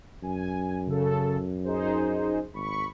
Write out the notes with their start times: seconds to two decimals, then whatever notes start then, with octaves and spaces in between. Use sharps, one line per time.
0.23 F#2 G#5
0.87 C#3 A4
1.64 D#4 G#4 C5
2.54 G#1 B5 C#6